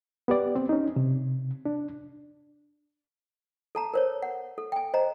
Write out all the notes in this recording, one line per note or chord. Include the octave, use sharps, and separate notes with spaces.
B3 G4 D5
C4
C#4 D#4
C3
D4
A4 A5 A#5
A#4 C5 C#5
F#5
A4
G5 G#5
C5 D#5 A#5